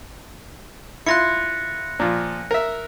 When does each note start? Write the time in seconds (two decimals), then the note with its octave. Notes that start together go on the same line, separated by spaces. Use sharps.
1.06 E4 F4 C6 F#6 A#6 C#7
2.00 A#2 F3
2.51 A#4 E5